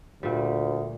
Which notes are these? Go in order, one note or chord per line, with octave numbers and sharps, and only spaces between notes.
D2 A#2 G3